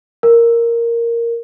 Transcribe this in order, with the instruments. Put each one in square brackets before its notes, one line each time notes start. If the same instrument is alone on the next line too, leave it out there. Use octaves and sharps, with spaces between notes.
[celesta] A#4